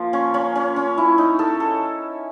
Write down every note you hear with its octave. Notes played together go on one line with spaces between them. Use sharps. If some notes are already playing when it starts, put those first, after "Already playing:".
Already playing: F3 A#3
C#4
C#4
C#4
C#4
E4
D#4
A4
A4